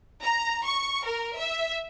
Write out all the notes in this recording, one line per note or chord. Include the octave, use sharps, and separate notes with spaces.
A#5
C#6
A#4
E5